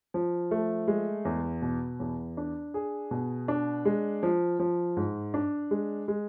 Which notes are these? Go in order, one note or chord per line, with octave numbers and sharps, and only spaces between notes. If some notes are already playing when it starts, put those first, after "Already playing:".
F3
A3
G#3
E2
B2
E2
D4
G#4
B2
D4
G#3
F3
F3
G#2
D4
G#3
G#3